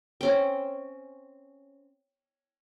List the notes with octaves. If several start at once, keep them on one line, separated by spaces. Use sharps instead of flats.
C4 C#4 G5